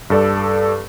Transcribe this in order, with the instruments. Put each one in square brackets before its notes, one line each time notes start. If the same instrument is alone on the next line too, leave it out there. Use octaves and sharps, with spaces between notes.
[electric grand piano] G2 A4 D5